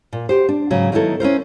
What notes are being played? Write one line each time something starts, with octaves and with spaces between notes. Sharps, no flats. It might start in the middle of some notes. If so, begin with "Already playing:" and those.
A#2
F#4 G4 C5
D4
G#2 C#3 F#3
D#3 F#3 B3 E4 A4
C#4 E4 A#4 C5